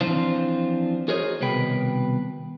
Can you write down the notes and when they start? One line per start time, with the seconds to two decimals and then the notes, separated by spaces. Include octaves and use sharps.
0.01 E3 F3 C4 D4 F4 C5
1.08 F#4 G#4 A#4 C5 C#5 D#5
1.40 C2 B2 D#3 B4 G5 B5